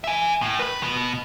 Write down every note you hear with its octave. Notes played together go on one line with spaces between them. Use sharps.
E5 G#5
A2
B4 B5
B2 B3